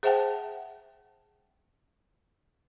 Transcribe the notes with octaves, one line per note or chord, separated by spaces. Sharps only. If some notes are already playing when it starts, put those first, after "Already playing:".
G#4 C5 E5 F#5 G5 A5